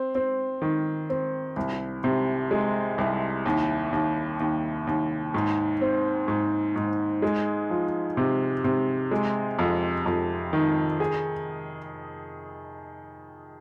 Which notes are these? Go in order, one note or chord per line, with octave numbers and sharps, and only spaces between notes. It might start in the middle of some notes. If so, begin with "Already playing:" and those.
Already playing: C4
C4
D#3
C4
C2
C3
G#3
C2
D#2
D#2
D#2
D#2
G#2
C4
G#2
G#2
G#3
F3
C3
C3
G#3
F2
F2
D#3
G#4